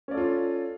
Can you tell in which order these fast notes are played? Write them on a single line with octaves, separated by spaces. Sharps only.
C#4 D5 A4 F4